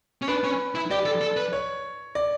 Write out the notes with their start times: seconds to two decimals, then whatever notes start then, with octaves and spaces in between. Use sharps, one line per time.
0.22 C#4
0.28 D4 B4
0.44 C#4
0.75 E4
0.91 G4 D5
1.06 A4
1.21 A4
1.37 B4
1.53 C#5
2.15 D5